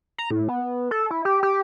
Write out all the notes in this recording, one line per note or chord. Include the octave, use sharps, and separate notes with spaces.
A#5
A2
B3
A4
E4
G4
G4